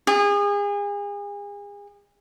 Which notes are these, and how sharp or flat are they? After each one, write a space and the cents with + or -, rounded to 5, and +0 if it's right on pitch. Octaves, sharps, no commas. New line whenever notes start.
G#4 -35